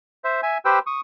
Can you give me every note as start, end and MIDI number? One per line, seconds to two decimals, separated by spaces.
0.24 0.41 72
0.24 0.41 76
0.43 0.58 76
0.43 0.58 80
0.65 0.79 67
0.65 0.79 71
0.65 0.79 72
0.65 0.79 79
0.65 0.79 88
0.87 1.01 85
0.87 1.01 87